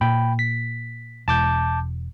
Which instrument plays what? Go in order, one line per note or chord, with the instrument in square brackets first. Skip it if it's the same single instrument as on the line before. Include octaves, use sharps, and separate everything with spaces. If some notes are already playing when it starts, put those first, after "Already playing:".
[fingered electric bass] A#2 [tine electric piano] G5 B5
[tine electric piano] B6
[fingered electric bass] E1 [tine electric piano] A5 D6 G6